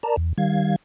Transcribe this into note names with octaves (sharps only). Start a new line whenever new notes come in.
A#4 D5 A5 A#5
E2
D#3 G3 F5 G#6